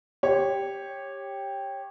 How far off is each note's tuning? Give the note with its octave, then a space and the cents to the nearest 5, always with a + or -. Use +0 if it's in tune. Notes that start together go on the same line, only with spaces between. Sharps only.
G4 +5 C#5 -15